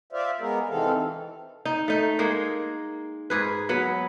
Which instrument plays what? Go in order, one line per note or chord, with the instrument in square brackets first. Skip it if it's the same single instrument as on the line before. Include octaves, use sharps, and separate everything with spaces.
[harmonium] F4 C5 D5 E5 F5
G#3 B3 G#4 A#4
C3 D#3 E3 C4 A4 F5
[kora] D#4
A3 D#4
G#3 A#3 G#4
G#2 G#4 B4
F#3 B3